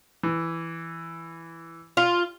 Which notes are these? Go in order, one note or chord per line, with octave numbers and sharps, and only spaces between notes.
E3
F4